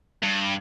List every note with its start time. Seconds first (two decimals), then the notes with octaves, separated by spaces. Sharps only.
0.23 G2